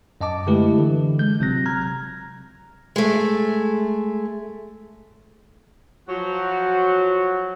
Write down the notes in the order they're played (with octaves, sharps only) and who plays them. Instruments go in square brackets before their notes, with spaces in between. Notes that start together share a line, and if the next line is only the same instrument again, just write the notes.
[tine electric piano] F#2 D#5 A5 D6
D3 G#3 A3 E4 G4 B4
D3 E3
G#3 G6
G1 C3 F#3 C4 F#6 A#6
A#5 F6 G#6
[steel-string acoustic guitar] G#3 A3
[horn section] F3 F#3 F#4